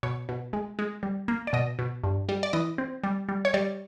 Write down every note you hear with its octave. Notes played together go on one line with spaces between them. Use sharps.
B2 C#5
B2
G#3
G#3
G3
A#3
D5
B2 D#5
B2
G2
G3
D5
E3 D#5
C4
G3
G3
C#5
G3 D5